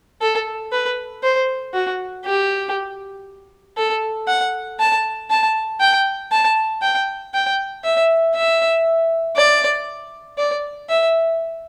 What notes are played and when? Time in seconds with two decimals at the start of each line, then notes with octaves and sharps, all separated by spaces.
0.21 A4
0.72 B4
1.23 C5
1.74 F#4
2.25 G4
3.76 A4
4.28 F#5
4.79 A5
5.30 A5
5.80 G5
6.31 A5
6.82 G5
7.34 G5
7.84 E5
8.35 E5
9.36 D5
10.38 D5
10.89 E5